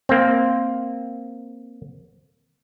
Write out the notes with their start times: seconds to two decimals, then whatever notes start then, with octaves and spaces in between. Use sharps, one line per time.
0.09 A#3 C4